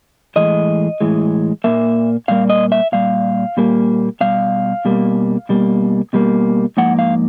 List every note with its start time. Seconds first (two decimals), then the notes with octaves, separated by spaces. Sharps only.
0.36 A2 E3 G#3 D#5
1.01 A2 E3 G#3
1.64 A#2 G3 A#3 E5
2.28 A#2 G3 A#3 F5
2.50 D#5
2.72 E5
2.92 A#2 G3 F5
3.57 A#2 G3 A#3
4.21 B2 G3 F5
4.85 B2 G3 A#3
5.49 B2 G3 A#3
6.13 B2 G3 A#3
6.77 G#2 F3 A#3 F#5
6.99 F5